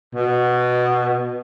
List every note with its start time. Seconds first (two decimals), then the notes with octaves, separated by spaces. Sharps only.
0.15 B2